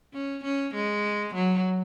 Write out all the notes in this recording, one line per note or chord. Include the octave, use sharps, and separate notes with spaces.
C#4
C#4
G#3
F#3